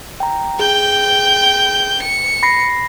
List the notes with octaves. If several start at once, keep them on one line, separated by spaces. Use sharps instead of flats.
G5 A#5
G#4 G5 G6
C#7
B5 A#6 C7